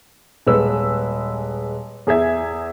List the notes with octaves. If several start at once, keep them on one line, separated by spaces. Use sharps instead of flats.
D#1 G#3 B4 E6
E2 G#4 E5 G#6